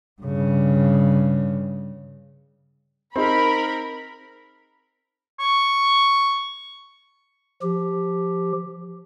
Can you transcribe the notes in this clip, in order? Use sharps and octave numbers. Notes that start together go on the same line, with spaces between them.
G2 C#3
C4 D#4 G#4 A#4 B5
C#6
F3 G4